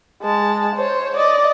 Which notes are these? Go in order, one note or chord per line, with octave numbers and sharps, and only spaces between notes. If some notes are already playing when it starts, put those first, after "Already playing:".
G#3 A5
C5 C#5
D5 D#5